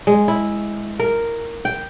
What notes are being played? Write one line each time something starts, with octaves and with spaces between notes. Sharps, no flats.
G#3
E4
A#4
G5